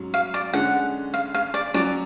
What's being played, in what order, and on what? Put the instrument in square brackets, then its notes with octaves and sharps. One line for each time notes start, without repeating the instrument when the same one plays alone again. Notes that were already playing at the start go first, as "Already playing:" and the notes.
Already playing: [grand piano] G#2 F#3 C#4
[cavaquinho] F5
D5
[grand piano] D3 G#3 C#4 [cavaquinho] F#5
[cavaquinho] F5
F5
D5
[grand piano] F#3 C#4 F#4 [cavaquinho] D5